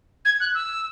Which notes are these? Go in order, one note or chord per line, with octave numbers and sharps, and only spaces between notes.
G#6
F#6
E6